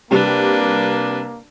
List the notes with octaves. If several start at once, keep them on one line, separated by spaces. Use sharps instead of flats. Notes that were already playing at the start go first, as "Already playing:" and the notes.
C3 G3 A#3 D4 B4 F7